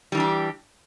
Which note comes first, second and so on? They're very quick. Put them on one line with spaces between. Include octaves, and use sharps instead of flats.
G3 E3 D4 G4